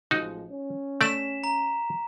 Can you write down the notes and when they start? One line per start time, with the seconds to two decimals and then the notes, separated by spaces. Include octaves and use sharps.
0.11 A1 F3 G#3 D#4 F#4
0.50 C#4
1.01 A3 D5 B6 E7
1.44 A#5